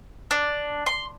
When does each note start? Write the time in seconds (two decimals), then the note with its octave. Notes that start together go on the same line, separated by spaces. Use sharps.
0.31 D4
0.86 C6